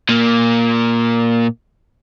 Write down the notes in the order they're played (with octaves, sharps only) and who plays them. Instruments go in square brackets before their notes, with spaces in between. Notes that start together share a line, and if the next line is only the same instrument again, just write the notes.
[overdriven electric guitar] A#2 A#3